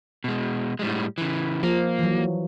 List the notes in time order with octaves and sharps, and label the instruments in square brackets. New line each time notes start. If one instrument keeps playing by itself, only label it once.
[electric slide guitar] B2 G#3
A2 G3 G#3
C#3 E3
[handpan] F3 [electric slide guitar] A#3
[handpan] E3 F#3